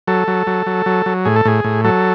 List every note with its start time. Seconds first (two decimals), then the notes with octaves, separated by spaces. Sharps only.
0.08 F#3 A4
0.28 F#3
0.47 F#3
0.67 F#3
0.86 F#3
1.06 F#3
1.25 A2 G#4
1.36 A4
1.45 A2 G#4
1.64 A2
1.84 F#3 A4